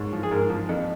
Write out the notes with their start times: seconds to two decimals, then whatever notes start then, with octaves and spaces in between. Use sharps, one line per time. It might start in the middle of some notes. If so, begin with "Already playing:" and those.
Already playing: G#2 C#5
0.13 F3
0.23 G#4
0.31 G#2 A#4
0.50 F3
0.69 F2